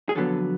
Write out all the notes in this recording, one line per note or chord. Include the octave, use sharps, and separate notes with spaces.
G#4
F2 D3 F#3 B3 A4